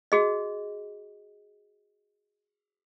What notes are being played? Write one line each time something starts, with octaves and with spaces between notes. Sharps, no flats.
F#4 G#4 D#5